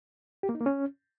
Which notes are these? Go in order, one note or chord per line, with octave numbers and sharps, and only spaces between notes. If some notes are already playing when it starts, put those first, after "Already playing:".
G4
A#3
D#4
A#3
C#4